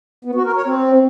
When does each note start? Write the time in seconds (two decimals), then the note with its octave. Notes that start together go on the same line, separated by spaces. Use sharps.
0.25 B3
0.35 F#4
0.45 A#4
0.55 C#5
0.65 C4